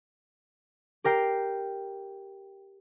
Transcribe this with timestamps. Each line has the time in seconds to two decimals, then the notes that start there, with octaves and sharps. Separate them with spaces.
1.04 G4 A#4 G5 C7